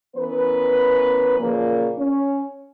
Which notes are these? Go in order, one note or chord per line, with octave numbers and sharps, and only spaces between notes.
E3 B3 C#4 A#4 B4
A#2 C#3 F3 A#3
C#4